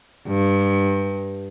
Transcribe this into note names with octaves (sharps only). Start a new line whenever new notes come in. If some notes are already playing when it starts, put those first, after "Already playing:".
G2